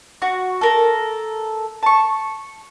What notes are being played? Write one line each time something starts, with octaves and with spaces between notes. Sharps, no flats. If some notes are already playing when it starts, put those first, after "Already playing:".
F#4
A4 A#4
A5 C#6